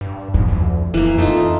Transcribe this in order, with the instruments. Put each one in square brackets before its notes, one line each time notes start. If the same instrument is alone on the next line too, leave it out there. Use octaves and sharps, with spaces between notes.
[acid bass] G2
[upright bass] F2 [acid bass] G#2
[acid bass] D2
[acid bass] D#1 [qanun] E3 A#3
[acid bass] F2 [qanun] A3 D#4 F4